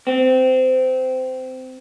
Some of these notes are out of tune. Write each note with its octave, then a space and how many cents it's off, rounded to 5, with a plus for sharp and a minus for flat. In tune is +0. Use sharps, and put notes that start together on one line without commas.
C4 -20